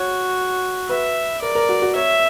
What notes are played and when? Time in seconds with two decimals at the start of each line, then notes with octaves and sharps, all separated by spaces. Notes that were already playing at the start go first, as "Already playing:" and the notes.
Already playing: F#4 C#5
0.89 B4 E5
1.42 A#4 D5
1.55 A#4
1.69 F#4
1.82 F#4
1.95 C#5 E5